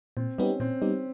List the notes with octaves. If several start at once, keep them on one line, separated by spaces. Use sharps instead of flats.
A#2 C4
G3 B3 C#4 D#4 G4
A#2 C4
G3 B3 D#4 G4